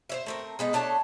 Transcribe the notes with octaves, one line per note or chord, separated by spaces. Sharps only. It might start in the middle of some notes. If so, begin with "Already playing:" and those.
C5 C#5 E5
A3 C4 A#4
G#3 B3 D#4
A3 D4 C#5 A5